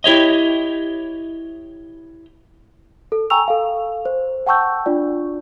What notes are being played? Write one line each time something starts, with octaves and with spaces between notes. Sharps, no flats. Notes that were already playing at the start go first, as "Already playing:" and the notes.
E4 G4 C#5 D#5
A4
G5 G#5 A#5 C#6 E6 F7
A4 F5
C5
F#5 G5 A5 C#6 E6 G6
D4 F4 D5